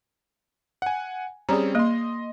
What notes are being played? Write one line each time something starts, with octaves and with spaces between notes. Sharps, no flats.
F#5 G#5
G3 C4 C#4 G#4 D5 A#5
A#3 D#5 C6